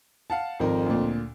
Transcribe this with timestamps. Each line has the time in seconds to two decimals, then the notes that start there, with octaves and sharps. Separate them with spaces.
0.30 F5 F#5 A5
0.60 G#1 F2 D#3 A#4
0.86 D2 A#2